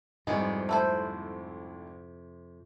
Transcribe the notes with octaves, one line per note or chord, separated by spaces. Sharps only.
C2 F2 G#2 C3 G#3 B3
A3 E4 C5